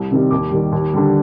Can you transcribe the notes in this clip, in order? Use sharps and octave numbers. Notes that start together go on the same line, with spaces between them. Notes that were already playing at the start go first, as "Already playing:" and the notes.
Already playing: C2
C3 D#3 G3
D#2 D6
D#3 G3
D#2
D3 G3